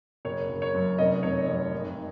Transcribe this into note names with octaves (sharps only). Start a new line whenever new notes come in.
F#1 C#5
F#1
C#5
F#2
F1 D#5
F1 C#5
F2
G#1